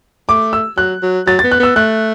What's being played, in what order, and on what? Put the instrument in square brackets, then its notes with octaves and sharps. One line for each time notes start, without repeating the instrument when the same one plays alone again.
[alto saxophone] A3 [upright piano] D6
[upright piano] E6
[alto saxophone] F#3 [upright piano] F#6
[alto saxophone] F#3
[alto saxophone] F#3 [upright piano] A6
[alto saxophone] B3 [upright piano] A6
[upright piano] F#6
[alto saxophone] B3 [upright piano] E6
[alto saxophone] A3 [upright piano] F#6